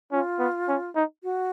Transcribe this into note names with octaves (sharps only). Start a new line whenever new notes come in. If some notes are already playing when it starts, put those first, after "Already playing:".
C#4 F4
B3
C#4
D#4
F#4